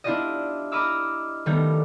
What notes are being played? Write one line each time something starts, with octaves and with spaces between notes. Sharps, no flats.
D4 E4 F4 G4 D5 D#5
D#5 A#5 B5 D6 E6 F6
D#3 G3 A3 B3 A#5 G6